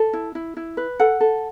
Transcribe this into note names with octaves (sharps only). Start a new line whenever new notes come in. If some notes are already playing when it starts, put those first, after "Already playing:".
Already playing: A4
E4
E4
E4
B4
A4 F#5
A4